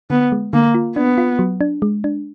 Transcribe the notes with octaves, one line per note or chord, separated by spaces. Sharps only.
D3 B3
G#3
D3 A#3
F4
B3 D4
F4
F#3
D4
G#3
D4